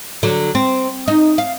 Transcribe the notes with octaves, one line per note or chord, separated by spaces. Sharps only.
D3 F#3
C4
D#4
F5